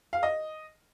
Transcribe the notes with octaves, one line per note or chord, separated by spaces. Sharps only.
F5
D#5